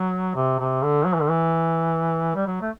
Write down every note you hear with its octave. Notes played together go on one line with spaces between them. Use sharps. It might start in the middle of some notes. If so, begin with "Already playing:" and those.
Already playing: F#3
C3
C3
D3
F#3
E3
D3
E3
G3
F#3
A3